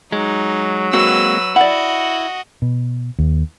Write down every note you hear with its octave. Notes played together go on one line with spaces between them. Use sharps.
F#3 G#3 D#4
G#3 A#3 C4 F#4 B4 E6
E4 F#4 D5 D#5 F#5
B2
D#2